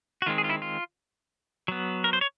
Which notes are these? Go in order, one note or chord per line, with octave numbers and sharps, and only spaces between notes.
F#4
D#3 G#3 C4 F4
G#4
F4
E4
F4
F#3 B3
A#4
C5
C#5